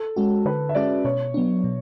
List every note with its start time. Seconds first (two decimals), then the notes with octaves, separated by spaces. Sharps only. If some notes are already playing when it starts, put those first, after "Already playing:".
Already playing: A4
0.16 G#3 C#4 F#4
0.45 D3 B4
0.69 E5
0.75 G#3 C#4 F#4 D5
1.05 B2 C#5
1.34 F#3 B3 D4
1.64 B2